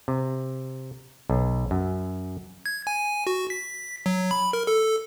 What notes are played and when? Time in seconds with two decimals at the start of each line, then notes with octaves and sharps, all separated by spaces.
0.08 C3
1.30 B1
1.71 F#2
2.66 G#6
2.87 G#5
3.27 F#4
3.50 B6
4.06 F#3
4.31 B5
4.53 A#4
4.67 A4